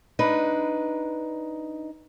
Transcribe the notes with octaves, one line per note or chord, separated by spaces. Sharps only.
D4 D#4 B4